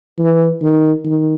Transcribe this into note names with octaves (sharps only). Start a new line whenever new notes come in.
E3
D#3
D#3